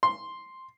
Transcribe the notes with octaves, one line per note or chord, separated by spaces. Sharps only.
C6